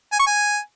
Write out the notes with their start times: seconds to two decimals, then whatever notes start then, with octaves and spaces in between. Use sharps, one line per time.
0.12 G#5
0.20 C#6
0.27 G#5